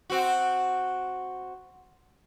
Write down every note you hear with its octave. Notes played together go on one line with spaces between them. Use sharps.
C4 F#4